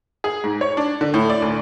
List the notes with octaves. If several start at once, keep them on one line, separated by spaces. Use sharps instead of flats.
G#4
G#2
C#5
D4
D3
A2
D5
D2